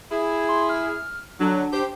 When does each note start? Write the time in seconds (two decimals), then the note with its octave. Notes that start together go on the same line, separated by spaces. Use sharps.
0.12 E4 G#4
0.48 C6
0.69 F6
1.40 D3 F#3 D4
1.73 G4 C5